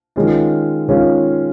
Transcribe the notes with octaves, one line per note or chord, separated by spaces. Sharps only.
D#3 G#3 C#4 F4 F5
D#3 G#3 C#4 F4